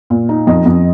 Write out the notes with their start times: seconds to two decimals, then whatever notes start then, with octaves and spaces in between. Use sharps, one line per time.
0.10 A#2
0.29 D#4
0.47 F2 D#5
0.65 F2